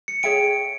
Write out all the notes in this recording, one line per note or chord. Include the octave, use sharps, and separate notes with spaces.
C#7
G#4 C#5 E5 G5 D7